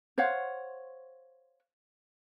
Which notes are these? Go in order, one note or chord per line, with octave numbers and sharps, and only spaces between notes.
C5 C#5 F5 F#5